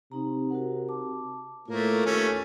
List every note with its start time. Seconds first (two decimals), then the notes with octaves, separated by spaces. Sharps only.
0.12 C3 C4 D#4 A#5
0.50 F#4 A#4 F#5
0.88 A5 D6
1.68 A2 A3 A#3 F4 A#4 B4
2.05 D#2 A3 C#4